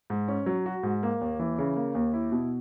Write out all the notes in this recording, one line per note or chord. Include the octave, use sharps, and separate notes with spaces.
G#2
C#4
F#3
F#4
G#2
A#3
D#2
E3
C#3
A#3
D#2
E4
B2